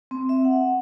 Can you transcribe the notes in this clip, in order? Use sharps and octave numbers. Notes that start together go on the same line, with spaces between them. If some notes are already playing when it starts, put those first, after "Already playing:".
C4
E5
F#5